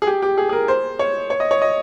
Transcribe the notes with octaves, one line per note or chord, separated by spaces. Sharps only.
G#4
G4
G4
G#4
G#4
A#4
C5
C#5
C#5
D#5
C#5
D#5